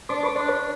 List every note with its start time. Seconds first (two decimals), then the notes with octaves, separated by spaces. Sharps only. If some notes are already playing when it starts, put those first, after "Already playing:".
0.09 D4 C5 D5
0.23 B4 C#5
0.35 D4 C5 D5
0.48 B4 C#5